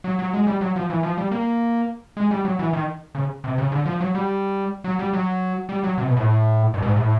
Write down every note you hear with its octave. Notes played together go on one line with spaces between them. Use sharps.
F#3
F#3
G#3
G3
F#3
F3
E3
F3
G3
A#3
G#3
G3
F#3
E3
D#3
C#3
C3
C#3
D3
F3
F#3
G3
F#3
G3
F#3
G3
F#3
C3
B2
A2
G2
G#2
A2